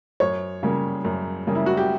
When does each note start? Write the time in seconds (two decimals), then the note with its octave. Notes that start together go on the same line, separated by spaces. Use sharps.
0.20 F#2 C#5
0.63 C#3 G3 A#3
1.05 F#2
1.47 C#3 G3 A#3
1.55 E4
1.66 F#4
1.77 G4